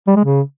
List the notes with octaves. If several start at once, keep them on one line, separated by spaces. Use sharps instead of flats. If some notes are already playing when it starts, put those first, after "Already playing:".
G3
G#3
C#3